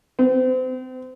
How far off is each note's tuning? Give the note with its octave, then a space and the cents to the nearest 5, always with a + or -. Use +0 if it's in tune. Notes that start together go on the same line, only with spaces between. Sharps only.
C4 -35